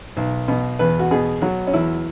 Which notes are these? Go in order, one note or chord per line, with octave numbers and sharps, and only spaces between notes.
B1
B2
E2 B4
F#4
B2 G#4
F#3 F#4
C#4
E2 E4